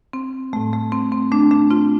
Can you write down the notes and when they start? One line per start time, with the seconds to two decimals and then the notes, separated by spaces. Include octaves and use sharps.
0.13 C4
0.53 A2 G3 A3
0.73 A3
0.92 C4
1.12 C4
1.32 A3 D4
1.51 A3 D4
1.70 C4 F4